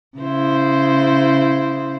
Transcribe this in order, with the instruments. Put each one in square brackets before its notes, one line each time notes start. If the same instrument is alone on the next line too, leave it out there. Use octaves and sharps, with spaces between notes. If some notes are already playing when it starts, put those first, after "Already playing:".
[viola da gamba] C#3 E4 C5